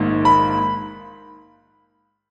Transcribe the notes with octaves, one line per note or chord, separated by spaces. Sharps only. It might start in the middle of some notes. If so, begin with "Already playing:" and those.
Already playing: A#1 G#2 D#3 A#3
B5